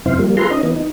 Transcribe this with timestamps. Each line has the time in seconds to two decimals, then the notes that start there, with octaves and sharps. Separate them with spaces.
0.06 F#2 C3 E4 C5 F5
0.19 F3 G3 A#3
0.37 F4 G#4 A4 B4 A#5 C6
0.50 C#4 D#4 D#5
0.63 E3 B3
0.76 D#4